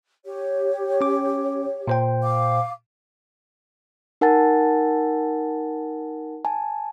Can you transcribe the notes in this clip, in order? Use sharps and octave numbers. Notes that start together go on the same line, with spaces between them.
G4 C#5
C#4 D6
A#2 C5 G5
F5 D6
D#4 A#4 F#5 G#5 A5 A6
G#5 A5